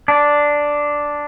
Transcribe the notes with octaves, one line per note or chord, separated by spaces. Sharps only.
D4